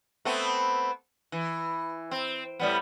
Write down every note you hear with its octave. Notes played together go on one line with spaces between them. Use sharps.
A3 B3 C4
E3
C4
A2 G3 B3